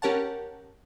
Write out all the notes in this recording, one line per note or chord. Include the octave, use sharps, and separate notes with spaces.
C#4 G4 A#4 C#5 F#5 A5